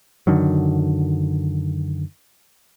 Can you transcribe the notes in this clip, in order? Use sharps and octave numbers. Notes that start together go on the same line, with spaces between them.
F#2 D3 D#3 F#3